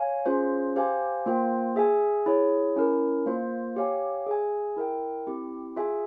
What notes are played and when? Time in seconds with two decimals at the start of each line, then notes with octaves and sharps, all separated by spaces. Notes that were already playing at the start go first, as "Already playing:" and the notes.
Already playing: C#5 F5 G#5
0.26 C#4 F4 G#4 C5
0.76 G4 C5 F5 G#5
1.26 A#3 F4 C5 G5
1.76 G#4 E5 G#5
2.26 E4 G#4 C#5
2.76 C#4 E4 A#4
3.26 A#3 F4 C5
3.76 G4 C#5 F5 G#5
4.27 G#4 E5 G#5
4.76 E4 A#4 E5 G5
5.27 C4 E4 G4
5.76 F4 G#4 E5 G#5